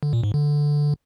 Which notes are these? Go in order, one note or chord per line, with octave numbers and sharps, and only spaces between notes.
D3
A#2
G#2
D3